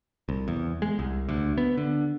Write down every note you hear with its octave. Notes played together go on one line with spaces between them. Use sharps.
C2
E2
G#3
C2
D2
B3
D3